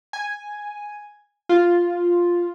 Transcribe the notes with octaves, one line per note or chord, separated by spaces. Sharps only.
G#5
F4